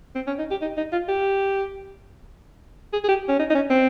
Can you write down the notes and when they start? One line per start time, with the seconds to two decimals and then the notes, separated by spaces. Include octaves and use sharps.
0.15 C4
0.27 C#4
0.39 D#4
0.51 G4
0.62 D#4
0.77 D#4
0.92 F4
1.08 G4
2.93 G#4
3.04 G#4
3.09 G4
3.28 C#4
3.39 D#4
3.50 D#4
3.55 C#4
3.70 C4